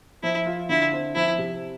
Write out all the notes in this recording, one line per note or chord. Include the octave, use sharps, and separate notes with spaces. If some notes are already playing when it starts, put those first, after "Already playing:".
F3 E4
F4
D3 E4
C4
F3 E4
C3